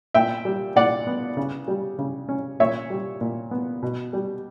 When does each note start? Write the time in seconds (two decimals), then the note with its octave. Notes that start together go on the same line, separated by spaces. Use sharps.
0.14 A#2 E5 G5
0.45 G3
0.76 A#2 D5 F#5
1.07 B3
1.37 C#3
1.68 G3
1.98 C#3
2.29 C#4
2.60 A#2 C#5 E5
2.90 G3
3.21 A#2
3.51 B3
3.83 B2
4.13 G3